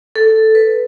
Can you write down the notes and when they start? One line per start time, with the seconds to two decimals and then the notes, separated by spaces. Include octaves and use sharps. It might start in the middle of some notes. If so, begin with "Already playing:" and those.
0.16 A4
0.55 B4